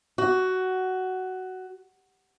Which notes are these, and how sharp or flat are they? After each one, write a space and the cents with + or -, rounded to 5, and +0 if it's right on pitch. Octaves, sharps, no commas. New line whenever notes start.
F#4 +10